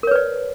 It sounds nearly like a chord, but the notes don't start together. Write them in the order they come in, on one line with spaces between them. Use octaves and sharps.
A#4 C#5 B4 D5